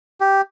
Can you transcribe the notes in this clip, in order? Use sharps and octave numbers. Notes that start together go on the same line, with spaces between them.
G4